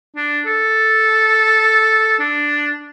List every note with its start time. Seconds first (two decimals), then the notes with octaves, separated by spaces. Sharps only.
0.16 D4
0.46 A4
2.19 D4